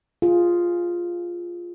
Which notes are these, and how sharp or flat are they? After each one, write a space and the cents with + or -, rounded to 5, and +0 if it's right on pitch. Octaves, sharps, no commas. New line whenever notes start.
F4 +0 G#4 +0